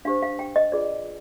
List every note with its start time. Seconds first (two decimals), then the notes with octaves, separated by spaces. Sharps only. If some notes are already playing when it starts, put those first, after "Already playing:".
0.05 D4 G4 C5 F5
0.23 F5
0.39 G5
0.56 D#5
0.72 F4 G#4 B4 D5